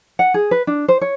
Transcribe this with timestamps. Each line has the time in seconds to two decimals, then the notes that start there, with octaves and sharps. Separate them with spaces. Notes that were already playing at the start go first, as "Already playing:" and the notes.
0.19 F#5
0.34 G#4
0.51 B4
0.67 D4
0.88 C5
1.01 C#5